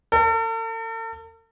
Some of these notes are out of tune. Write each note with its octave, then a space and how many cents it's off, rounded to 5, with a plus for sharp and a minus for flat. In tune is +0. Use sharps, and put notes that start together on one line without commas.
A4 +45